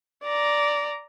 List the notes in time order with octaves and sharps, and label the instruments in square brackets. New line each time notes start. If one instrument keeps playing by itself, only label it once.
[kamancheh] D5 A#5